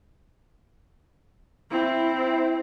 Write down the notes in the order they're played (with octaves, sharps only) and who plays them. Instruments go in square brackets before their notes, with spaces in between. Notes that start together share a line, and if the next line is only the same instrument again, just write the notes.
[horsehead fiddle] C4 E4